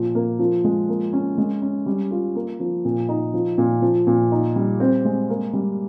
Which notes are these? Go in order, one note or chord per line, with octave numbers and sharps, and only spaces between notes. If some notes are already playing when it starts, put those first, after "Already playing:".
Already playing: A#2 F3
A#3
F3
G#3
A#3
C#4
G#3
C#4
G3
F4
A#3
F3
A#2
D#4
F3
A#2
F3
A#2
D#4
G3
C4
G#3
A#3
G3